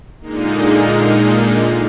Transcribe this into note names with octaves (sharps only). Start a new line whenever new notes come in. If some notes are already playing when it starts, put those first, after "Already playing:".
A#2 D3 G#3 A#3 D#4